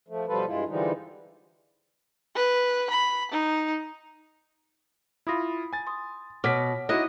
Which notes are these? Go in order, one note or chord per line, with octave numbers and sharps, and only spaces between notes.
F3 A3
B2 F3 G3 F4 A4 B4
G2 G#3 E4 F4
D3 E3 F3 G3 G#3 D#4
B4
B5
D#4
E4 F4 B5 D#6 A#6
G#5 A6
C6 D#6
B2 C#5 D6 F6 B6
D#4 E4 F#4 D#5 D#6 F#6 A#6